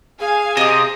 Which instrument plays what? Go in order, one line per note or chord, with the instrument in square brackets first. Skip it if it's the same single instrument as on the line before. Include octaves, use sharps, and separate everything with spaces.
[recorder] G#4 [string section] F5 G#5
[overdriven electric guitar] C3 [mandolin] D#5 D#6